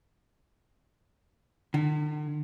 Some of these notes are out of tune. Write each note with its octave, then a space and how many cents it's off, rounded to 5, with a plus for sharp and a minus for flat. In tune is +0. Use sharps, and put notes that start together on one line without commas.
D3 +45